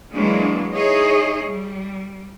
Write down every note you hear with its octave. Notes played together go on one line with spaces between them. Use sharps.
E3 F#3 G#3 A#3 D4
D#4 E4 G#4 C#5 D#5
G3